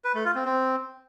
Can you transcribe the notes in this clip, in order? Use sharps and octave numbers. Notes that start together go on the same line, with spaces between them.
B4
A3
F4
C4
C4